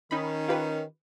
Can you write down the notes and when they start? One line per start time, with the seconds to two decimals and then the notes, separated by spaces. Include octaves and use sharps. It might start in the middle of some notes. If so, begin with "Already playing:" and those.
0.11 D#3 C#4 D#4 B5
0.48 F4 G4 B4